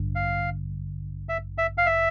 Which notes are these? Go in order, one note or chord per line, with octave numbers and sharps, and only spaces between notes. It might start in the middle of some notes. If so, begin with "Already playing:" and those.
Already playing: A1 G2 D3
F5
E5
E5
F5
E5